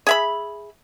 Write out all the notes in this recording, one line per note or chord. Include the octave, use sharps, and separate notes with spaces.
G#4 E5 B5